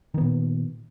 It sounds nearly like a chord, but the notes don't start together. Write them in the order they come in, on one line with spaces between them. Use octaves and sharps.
D#3 B3 A#2